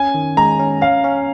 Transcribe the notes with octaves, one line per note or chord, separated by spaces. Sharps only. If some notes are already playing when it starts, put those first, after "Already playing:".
Already playing: C#4 G#5
D#3
G#3 A#5
C#4
C#4 F5
C#4